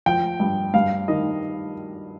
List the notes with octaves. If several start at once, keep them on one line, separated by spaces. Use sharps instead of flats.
F3 G5
G2
G2 F5
D#3 D#5